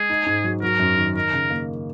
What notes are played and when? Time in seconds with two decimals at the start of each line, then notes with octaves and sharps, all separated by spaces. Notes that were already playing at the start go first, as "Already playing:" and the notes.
Already playing: G#3 G#4
0.10 D#4
0.27 G#2
0.44 F#3
0.62 F#3 A#4
0.80 F#2
0.98 D#3
1.15 D#4 A#4
1.33 C#3
1.50 A#3